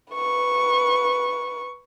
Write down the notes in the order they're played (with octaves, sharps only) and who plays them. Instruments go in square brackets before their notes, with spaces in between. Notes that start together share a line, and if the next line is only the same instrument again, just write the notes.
[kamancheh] B4 C#6